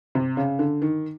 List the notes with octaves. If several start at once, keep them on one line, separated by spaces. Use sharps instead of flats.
C3
C#3
D3
D#3